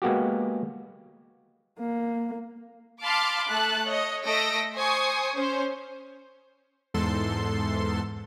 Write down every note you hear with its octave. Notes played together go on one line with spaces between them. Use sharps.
G#3 A#3 B3 F#4 G4
A#3
F5 A5 B5 C6 D6 F6
A3 A5 F#6
C#5 D#5
A3 D#5 E6 A#6 D7
C5 G#5 C#6 D#6
C#4 C5
E2 G#2 A4 C6